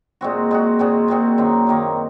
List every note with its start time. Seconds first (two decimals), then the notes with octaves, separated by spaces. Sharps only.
0.21 A#2 G#3 C4 F#4
0.51 A#2 G#3 C4 F#4
0.79 A#2 G#3 C4 F#4
1.08 A#2 G#3 C4 F#4
1.38 F#2 D#3 A#3
1.67 F#2 D#3 A#3